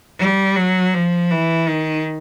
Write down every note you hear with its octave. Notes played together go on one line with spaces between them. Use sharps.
G3
F#3
F3
E3
D#3